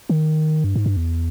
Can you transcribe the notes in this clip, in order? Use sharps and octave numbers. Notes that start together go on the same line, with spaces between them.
D#3
G2
G#2
G2
E2